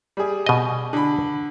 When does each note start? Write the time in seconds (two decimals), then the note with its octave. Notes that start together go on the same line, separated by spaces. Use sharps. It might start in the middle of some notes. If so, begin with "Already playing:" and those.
0.17 G3 G#4
0.46 B2 D#5
0.93 D3 B5